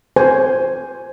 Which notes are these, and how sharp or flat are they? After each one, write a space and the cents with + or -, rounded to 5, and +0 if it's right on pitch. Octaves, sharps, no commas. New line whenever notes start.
C5 +0 G#5 +0